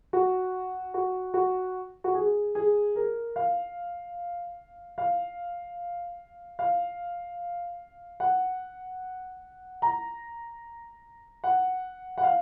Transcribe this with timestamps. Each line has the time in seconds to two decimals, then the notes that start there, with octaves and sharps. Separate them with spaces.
0.13 F#4
0.94 F#4
1.34 F#4
2.04 F#4
2.15 G#4
2.55 G#4
2.96 A#4
3.36 F5
4.98 F5
6.59 F5
8.20 F#5
9.82 A#5
11.44 F#5
12.18 F#5
12.23 F5